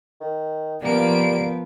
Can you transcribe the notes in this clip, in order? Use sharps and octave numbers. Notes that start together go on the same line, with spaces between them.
D#3
F3 G3 A#3 B3 D7